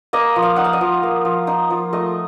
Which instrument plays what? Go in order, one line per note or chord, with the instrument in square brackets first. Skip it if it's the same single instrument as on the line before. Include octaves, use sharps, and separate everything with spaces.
[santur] A#3 D#5
F3
F5
D#4 F#5
F5
D#5
F3
A#3
F3
D#4
F3
A3 D#5